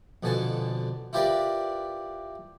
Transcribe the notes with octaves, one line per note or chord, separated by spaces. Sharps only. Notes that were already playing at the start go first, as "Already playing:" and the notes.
F2 B2 D3 G#5 A5
E4 F4 G4 A#4 B4 D5